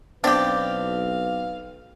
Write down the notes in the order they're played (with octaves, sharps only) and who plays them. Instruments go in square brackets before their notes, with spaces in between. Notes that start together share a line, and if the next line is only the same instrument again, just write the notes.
[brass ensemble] B1 B4 [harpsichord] B3 C4 D5 [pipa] D4 G4 [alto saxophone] F5